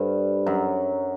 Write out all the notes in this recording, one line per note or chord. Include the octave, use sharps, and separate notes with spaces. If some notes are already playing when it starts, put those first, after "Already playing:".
Already playing: G2 G3 A4 C5
F#2 F#3